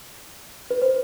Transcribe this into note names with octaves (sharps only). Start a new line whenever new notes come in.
B4
C5